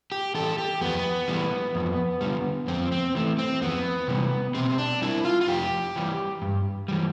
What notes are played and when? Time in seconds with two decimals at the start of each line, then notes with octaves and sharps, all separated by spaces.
0.12 G4
0.35 E3 G3 A4
0.58 G4
0.81 F2 B3
1.28 E3 G3
1.75 F2
2.21 D3 G3
2.68 F2 C4
2.92 C4
3.15 E3 A3
3.38 C4
3.61 F2 B3
4.08 C3 E3 G3
4.55 B2 C4
4.78 D4
5.02 G3 E4
5.25 F4
5.41 F4
5.48 F2 G4
5.96 E3 G3
6.42 G2
6.88 E3 G3